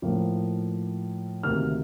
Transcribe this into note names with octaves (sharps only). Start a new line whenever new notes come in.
A2 F3 A#3
D2 C3 D#3 A#3 F6